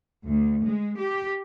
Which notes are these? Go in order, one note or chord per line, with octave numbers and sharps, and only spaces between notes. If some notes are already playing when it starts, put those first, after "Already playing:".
D2
G#3
G4